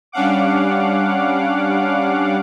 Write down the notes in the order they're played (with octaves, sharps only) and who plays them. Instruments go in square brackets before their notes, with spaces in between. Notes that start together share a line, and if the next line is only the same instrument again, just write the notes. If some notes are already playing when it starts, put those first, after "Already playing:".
[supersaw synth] G3 C#4 D4 F5 F#5 D6